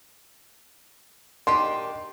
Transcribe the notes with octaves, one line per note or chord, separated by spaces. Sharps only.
D#3 D4 G4 C6